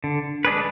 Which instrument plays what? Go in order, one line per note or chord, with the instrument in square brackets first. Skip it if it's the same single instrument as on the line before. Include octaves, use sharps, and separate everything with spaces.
[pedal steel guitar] D3
G#3 D4 G#4 B4